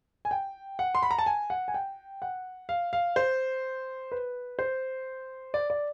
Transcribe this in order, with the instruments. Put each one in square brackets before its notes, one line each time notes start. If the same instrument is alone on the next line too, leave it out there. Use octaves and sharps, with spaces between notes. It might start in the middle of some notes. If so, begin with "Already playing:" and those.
[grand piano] G#5
G5
F#5
C6
B5
A#5
A5
G#5
F#5
G#5
G5
F#5
F5
F5
C5
B4
C5
D5
D5